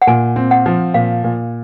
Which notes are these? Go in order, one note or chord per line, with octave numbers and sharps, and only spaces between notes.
F#5
A#2 G#5
C4
F#5
F3
A#2 F5
A#2